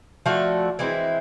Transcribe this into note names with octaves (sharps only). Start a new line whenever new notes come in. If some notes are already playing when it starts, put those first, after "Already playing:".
F3 A3 D4 F#4
E3 G#3 C4 E4